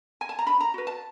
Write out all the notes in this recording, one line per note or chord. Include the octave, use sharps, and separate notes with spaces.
G#5
A5
A#5
D4 B5
A#5
F#4 B4
A5